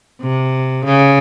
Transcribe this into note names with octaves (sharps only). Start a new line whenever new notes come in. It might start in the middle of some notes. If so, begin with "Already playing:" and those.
C3
C#3